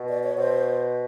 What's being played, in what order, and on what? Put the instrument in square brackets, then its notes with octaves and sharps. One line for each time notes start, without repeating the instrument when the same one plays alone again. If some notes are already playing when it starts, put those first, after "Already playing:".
Already playing: [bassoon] B2
[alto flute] D5
C#5
[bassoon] B2 [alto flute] C5